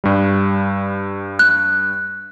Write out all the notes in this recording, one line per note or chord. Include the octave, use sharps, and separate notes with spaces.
G2 G3
F#6